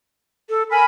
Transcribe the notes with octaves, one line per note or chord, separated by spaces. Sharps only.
A4
A#4 G#5 B5